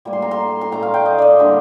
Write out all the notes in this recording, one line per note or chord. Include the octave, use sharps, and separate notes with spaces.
A2 G3 A#3
C6
A#5
C6
C6
A2 A3 A#5
F5
G5
D#5
D5 D#5
D3 G3 A#3